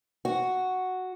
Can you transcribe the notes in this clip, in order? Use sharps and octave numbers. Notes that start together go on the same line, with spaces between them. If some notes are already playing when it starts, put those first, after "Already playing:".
F#4